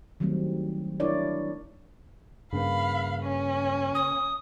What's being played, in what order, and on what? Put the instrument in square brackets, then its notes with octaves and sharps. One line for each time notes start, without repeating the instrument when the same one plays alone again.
[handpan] D#3 F#3 G3 A3 C4
D4 E4 A#4 C#5 D5
[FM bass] G2 [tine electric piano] C#3 A#3 B4 [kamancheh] F5 B5
[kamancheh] C#4
[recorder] D#6